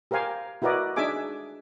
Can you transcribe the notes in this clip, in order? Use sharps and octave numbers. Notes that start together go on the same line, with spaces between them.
G4 A#4 C5 F5 G#5
E4 F#4 A#4 B4 D5 D#5
D4 D#4 G#4 E5 G#5 D6